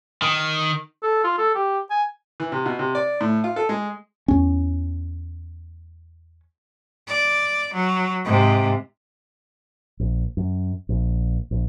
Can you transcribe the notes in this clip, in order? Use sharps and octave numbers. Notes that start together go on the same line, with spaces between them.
D#3
A4
F4
A4
G4
G#5
E3
C3
B2
C3
D5
A2
F4
A4
G#3
E2 C#4
D5
F#3
G#2 C3
A#1
F#2
A#1
A#1